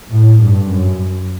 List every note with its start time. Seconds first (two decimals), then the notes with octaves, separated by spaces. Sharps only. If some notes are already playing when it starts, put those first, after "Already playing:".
0.11 A2
0.40 G2
0.68 F#2